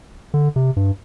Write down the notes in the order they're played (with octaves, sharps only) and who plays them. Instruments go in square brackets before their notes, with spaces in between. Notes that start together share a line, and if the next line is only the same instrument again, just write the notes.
[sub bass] D3
C3
G2